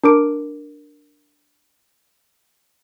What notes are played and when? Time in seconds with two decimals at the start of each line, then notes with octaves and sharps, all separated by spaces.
0.04 D4 A#4 D6 D7